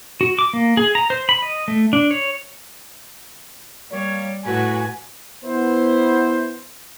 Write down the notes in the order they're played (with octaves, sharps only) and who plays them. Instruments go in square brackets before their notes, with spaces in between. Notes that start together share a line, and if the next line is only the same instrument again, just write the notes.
[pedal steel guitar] F#4
D6
A#3
G#4
A#5
C5
B5
D#5
A3
D4
C#5
[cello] G3 [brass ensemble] A#3 C#5
[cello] A2 B4 [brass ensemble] F#4 [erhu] G#5
[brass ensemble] B3 E4 C5